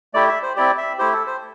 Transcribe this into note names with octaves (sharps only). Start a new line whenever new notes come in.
A3 E4 G4 D5
E5
C5
C4 E4 G4 D5
E5
A3 E4 G4 C5
A4
C5